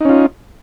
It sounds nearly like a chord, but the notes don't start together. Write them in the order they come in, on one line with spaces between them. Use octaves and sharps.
D#4 C#4 F4